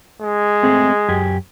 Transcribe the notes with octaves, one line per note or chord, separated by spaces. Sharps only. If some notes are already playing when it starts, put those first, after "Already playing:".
G#3
A3 C4 G#4
F#2 G4 G#5